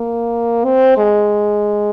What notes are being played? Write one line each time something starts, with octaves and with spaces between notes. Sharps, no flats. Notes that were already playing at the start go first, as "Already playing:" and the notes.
Already playing: A#3
C4
G#3